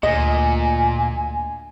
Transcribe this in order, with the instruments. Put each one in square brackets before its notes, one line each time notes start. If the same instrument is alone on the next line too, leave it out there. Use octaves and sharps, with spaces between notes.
[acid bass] D2 [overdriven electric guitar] A#2 [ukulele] D#5 [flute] G#5